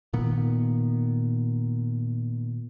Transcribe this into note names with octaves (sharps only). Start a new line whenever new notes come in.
A#2 D#3 B3